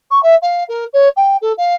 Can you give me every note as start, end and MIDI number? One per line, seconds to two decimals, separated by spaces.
0.10 0.21 85
0.22 0.34 76
0.42 0.63 77
0.68 0.84 70
0.93 1.08 73
1.16 1.36 79
1.41 1.52 69
1.57 1.74 77